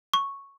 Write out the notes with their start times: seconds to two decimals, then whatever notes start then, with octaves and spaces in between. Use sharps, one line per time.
0.13 C#6